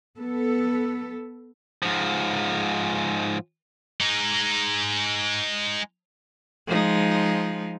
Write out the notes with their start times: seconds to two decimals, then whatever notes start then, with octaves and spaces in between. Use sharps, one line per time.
0.18 B3 A4
1.83 G#2 F3
4.01 G#3 D#4
6.67 F3 G#3 D#4